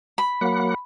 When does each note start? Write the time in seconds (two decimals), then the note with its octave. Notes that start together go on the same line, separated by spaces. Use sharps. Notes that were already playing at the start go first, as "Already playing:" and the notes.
0.18 B5
0.41 F#3 A#3 F#5